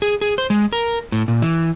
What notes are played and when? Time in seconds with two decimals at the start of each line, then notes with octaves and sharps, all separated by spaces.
0.02 G#4
0.21 G#4
0.38 C5
0.50 G#3
0.73 A#4
1.12 A2
1.28 A#2
1.42 E3